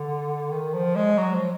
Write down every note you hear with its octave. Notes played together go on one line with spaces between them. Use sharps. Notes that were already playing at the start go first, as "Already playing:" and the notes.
Already playing: D3
D#3
F3
G#3
F#3
F3